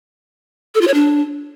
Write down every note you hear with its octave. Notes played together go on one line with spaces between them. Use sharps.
A4
F4
C#5
D4